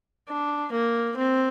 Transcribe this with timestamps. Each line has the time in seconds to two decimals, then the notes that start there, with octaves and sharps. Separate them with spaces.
0.28 D4
0.72 A#3
1.16 C4